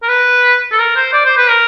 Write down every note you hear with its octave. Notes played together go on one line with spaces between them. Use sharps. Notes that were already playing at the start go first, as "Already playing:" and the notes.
A#4
B4
A4
A#4
C5
D5
C5
B4
A#4